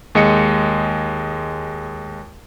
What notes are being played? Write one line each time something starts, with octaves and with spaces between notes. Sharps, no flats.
D#2 G#3 D#5 C#7